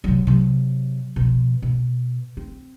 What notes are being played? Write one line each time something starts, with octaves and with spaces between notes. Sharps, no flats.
C3 F#3
C3 F#3
B2 F3
B2
C4